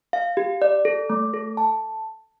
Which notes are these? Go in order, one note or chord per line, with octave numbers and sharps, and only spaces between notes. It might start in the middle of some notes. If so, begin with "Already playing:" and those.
F5
G4
D5
A4
A3
A4
A5